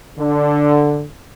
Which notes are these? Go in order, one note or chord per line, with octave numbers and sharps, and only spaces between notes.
D3